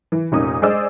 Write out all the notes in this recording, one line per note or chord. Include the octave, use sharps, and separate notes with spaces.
E3
F1 A#2 C#4 D#4 D#6
G#3 G#4 C5 D5 D#5 E6